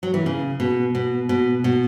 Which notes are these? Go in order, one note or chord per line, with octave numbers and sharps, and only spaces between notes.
F#3
E3
C#3
B2
B2
B2
B2